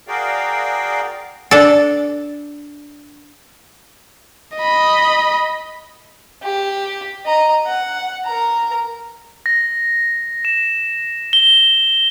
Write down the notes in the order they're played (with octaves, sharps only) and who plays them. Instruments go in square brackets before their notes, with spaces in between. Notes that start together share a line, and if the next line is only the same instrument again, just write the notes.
[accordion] F#4 G#4 A#4 D5 F5 G5
[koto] D4 A4
[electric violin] D#5 B5
[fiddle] G4
D#5 A#5
F#5
A#4 A#5
[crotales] A#6
E7
G7